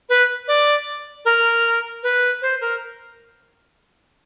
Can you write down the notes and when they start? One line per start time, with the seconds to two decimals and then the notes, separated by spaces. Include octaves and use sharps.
0.09 B4
0.48 D5
1.25 A#4
2.03 B4
2.42 C5
2.61 A#4